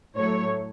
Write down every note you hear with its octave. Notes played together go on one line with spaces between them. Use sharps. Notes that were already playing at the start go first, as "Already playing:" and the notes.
A2 F#3 A3 C#5